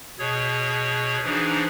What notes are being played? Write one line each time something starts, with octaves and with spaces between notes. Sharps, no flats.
B2 G#4 C#5
E3 F3 D4 D#4 G#4